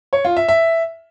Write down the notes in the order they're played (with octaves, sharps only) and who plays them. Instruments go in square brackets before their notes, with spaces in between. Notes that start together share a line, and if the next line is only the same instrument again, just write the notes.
[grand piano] C#5
F4
E5
E5